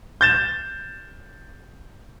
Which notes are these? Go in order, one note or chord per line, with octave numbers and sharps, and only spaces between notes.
G6 A6 E7